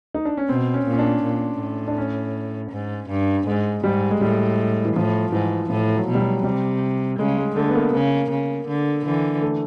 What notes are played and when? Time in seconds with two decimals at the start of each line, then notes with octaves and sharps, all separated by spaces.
0.14 D#4
0.25 D4
0.37 C#4
0.49 B2 C4
0.74 C#4
0.86 A#2
0.93 C#4
0.99 D4
1.23 A#2
1.60 A2
1.88 D4
1.98 C#4
2.72 G#2
3.09 G2
3.47 G#2 G#3
3.84 G#2 G3
4.11 G#3
4.21 A2 G3
4.85 E3
4.96 A2 F3
5.32 G#2 E3
5.70 A2 F3
5.95 F#3
6.07 B2
6.15 G3
6.20 F#3
6.44 C3 G3
7.19 C#3 G#3
7.38 G#3
7.56 D3 A3
7.69 B3
7.75 A#3
7.93 C#3 A#3
8.30 C#3
8.68 D3
9.05 D3 E3
9.42 A3